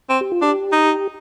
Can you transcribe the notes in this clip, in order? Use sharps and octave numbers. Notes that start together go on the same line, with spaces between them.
C4
G4
F4
D4 G4
D#4